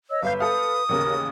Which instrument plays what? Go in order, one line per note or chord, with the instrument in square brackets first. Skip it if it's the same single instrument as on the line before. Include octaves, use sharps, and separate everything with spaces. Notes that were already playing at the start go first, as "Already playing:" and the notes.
[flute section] C#5 D#5 E6
[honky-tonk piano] G1 E5 G6 [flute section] B4 [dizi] F5
[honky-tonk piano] A4 F5 [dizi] D#6
[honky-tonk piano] A1 D#2 C#3 [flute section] A#4